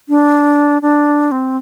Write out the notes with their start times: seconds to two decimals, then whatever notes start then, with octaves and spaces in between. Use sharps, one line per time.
0.09 D4
0.82 D4
1.31 C4